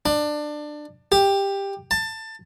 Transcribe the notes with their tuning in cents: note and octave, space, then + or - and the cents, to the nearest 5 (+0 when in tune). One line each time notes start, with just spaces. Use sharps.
D4 +20
G4 +10
A5 +20